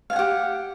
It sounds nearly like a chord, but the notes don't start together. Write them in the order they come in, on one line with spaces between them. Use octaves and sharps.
F5 G#5 F#5 G4